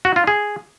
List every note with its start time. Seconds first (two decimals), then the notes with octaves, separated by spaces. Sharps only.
0.05 F#4
0.16 F4
0.27 G#4